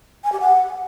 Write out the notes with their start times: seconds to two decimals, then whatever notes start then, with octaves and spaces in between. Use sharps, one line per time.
0.24 G#5
0.32 G4
0.40 F#5